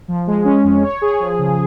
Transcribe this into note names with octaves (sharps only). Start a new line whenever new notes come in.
F3
G#3
C#4
F2
C#5
G#4
F3
C#3